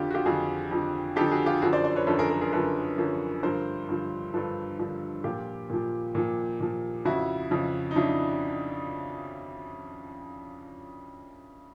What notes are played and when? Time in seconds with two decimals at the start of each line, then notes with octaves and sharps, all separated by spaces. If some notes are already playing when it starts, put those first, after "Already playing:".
Already playing: F2 D3 F3 F4 G4
0.11 F#4
0.15 F4 G4
0.26 F2 D3 F3 F#4 G#4
0.71 F2 D3 F3
1.16 F2 D3 F3 G4 A4
1.31 F#4 G#4
1.46 F4 G4
1.62 F#2 D3 F3 F#4 G#4
1.73 C5 D5
1.84 C5 D5
1.96 B4 C#5
2.07 F#2 D3 F3 A4 B4
2.18 G#4 A#4
2.30 G#4 A#4
2.41 G#4 A#4
2.52 F#2 D3 F3 A4 B4
2.98 F#2 D3 F3
3.43 G2 D3 F3 A#4 C5
3.89 G2 D3 F3
4.34 G2 D3 F3 A4 B4
4.79 G2 D3 F3
5.24 A#2 F3 F4 G4
5.70 A#2 F3
6.15 A#2 F3
6.60 A#2 F3
7.05 F2 C#3 F3 E4 F#4
7.51 F2 C#3 F3
7.91 D#4
7.95 C#3 F3 D4 E4